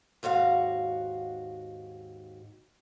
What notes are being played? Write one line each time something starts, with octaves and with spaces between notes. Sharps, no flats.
D#2 G#2 F#4 F5